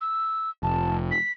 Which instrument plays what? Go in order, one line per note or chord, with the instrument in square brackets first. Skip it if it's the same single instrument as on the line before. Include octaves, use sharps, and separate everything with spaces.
[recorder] E6
[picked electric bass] F1 [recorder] A5
[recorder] B6